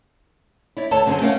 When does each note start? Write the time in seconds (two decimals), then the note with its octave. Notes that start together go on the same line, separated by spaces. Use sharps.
0.77 E4 C#5 D5
0.91 D2 A4 C#5 A5
1.06 F#2 D3 C#4 D4 G#4 C5
1.20 A3 C#4 A#4 C#5 F5 F#5